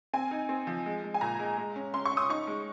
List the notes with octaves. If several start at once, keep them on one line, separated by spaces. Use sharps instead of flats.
C4 G#5
D#4
C4
F3
G#3
G#3
G#5
A#2 A#5
G#3
G#3
C#4
C#4 C6
C#6
C#4
D#6
D#4 C#6
G#3